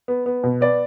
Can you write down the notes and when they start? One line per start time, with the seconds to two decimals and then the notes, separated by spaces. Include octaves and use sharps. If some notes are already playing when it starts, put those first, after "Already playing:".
0.08 B3
0.26 B3
0.44 B2
0.61 B3 D5